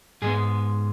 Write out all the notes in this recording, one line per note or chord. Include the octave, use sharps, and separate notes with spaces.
G#2 G#3 B3 G#4